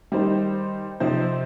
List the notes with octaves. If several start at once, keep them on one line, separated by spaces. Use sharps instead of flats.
D#3 G3 D#4 C5
C3 F3 C4 D#4 C5